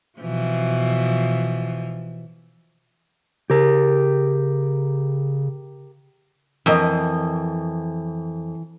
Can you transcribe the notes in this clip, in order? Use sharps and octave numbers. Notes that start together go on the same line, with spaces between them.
B2 E3 F3
C#3 G4 A#4
F2 E3 A#4 D#5